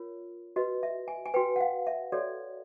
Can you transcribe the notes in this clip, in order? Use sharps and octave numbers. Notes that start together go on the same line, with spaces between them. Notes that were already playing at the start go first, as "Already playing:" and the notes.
Already playing: F4 A#4 C#5
F#4 B4 D#5
E5
G#5
G#5
F#4 B4 G5
F#5
F5
E5
F#4 A4 C#5 D5